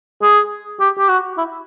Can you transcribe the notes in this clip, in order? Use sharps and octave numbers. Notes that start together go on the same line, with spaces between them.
G#4
G4
G4
F#4
E4